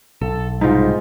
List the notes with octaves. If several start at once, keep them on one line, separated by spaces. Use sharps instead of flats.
B1 A4
G#2 C3 G3 D#4 F4